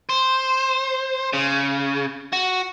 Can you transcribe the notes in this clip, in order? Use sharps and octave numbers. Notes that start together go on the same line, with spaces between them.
C5
C#3
F#4